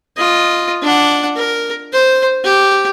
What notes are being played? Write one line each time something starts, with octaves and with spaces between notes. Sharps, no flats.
F4 D#5
D4 F#5
A#4
C5
G4